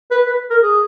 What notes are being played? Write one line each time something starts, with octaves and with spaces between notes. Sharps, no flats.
B4
B4
A#4
G#4